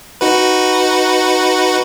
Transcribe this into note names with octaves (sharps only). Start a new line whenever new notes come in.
D#4 F#4 B4